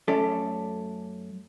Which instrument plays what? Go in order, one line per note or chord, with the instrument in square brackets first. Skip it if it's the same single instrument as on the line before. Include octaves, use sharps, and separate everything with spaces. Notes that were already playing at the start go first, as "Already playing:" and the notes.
[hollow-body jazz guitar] F#2 A3 C#4 A4 D5